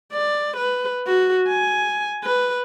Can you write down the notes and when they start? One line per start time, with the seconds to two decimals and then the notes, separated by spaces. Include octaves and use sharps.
0.13 D5
0.57 B4
1.07 F#4
1.49 G#5
2.24 B4